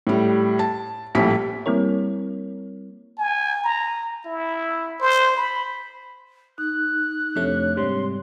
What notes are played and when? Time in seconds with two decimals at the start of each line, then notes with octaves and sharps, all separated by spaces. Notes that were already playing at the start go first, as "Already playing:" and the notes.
0.07 A2 G3
0.59 A5
1.15 A#1 A2 G3 A3 G#5 B6
1.66 G3 A#3 C4 E4 A#4 C#5
3.18 G#5
3.64 A#5
4.25 E4
5.01 C5
5.37 B5
6.58 D#4 F#6
7.35 F2 C3 A3 D4 C#5
7.77 G#2 C3 G3 C6